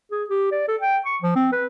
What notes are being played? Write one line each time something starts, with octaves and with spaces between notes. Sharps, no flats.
G#4
G4
D5
A4
G5
C#6
F3
C4
B4